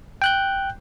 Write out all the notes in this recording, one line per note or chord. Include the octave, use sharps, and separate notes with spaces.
G5 F#6 G6